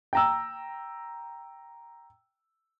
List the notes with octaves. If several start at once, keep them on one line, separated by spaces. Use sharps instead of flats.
G5 A#5 E6